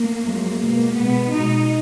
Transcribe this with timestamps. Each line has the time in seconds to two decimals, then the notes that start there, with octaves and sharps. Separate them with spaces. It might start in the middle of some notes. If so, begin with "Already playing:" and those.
Already playing: A#3
0.25 F#2 F3 G#3
0.60 B2 G#3 A#3
0.97 B2 G#3 B3
1.33 B2 G#3 D#4